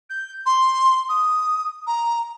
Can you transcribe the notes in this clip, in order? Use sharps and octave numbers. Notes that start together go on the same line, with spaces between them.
G6
C6
D#6
A#5